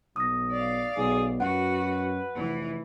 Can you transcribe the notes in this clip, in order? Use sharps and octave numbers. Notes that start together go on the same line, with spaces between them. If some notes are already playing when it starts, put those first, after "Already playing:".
B1 D#6 A#6
D5 F5
B1 G#4
F#2 F#4 B4 F#5
F1 E3